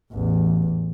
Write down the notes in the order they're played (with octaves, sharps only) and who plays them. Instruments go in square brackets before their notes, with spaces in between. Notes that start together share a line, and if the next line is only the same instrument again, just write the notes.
[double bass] A1 E2